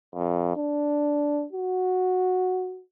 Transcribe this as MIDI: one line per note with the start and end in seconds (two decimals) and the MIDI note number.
0.14 0.54 41
0.56 1.45 62
1.53 2.81 66